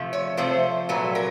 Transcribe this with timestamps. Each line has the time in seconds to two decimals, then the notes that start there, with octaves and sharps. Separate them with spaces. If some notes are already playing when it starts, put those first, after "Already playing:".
Already playing: C3 F3 A3
0.13 C#5
0.37 C3 F3 A3 C5
0.89 A#2 F#3 A3 B4
1.15 A#4